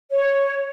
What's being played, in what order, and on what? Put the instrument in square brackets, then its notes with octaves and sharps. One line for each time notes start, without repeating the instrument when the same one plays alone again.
[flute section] C#5